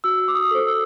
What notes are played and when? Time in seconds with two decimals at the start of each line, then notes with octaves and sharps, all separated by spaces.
0.04 F#4 E6
0.28 D6
0.35 D#6
0.51 A4 C5
0.67 E6